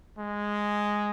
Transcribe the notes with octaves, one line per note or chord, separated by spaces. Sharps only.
G#3